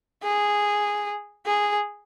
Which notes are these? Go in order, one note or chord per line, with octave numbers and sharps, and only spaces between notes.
G#4
G#4